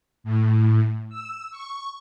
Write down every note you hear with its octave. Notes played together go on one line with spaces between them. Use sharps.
A2
E6
C#6